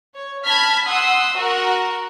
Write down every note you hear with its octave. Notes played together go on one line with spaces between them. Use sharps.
C#5
A5 B5 F6 G#6 B6
F#5 C6 D#6 E6
F#4 A#4 F#5